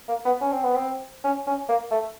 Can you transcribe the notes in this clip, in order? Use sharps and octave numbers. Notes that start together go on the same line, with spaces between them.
A#3
B3
C#4
C4
B3
C4
C#4
C#4
A#3
A3